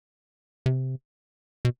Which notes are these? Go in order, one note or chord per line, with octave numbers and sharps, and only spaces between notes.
C3
B2